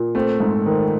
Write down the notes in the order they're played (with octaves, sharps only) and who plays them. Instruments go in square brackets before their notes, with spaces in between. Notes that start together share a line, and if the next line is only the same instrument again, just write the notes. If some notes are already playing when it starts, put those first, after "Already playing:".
Already playing: [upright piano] A#2
[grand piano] A3 [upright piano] C4
[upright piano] G#2
D#3